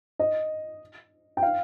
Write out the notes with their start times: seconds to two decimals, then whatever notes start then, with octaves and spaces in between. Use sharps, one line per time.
0.19 D#5
1.37 G5
1.43 F5